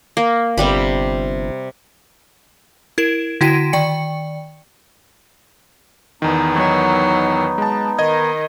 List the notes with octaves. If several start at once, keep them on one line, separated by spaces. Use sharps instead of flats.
A#3
G1 C3 G3 B5
E4 A#4 E7
D3 E4 F#4 G5 B6 D#7
D#3 D5 G5 C#7
E2 D#3 B3 D#4
F#3
G#3 A5
D#3 D#5 G#6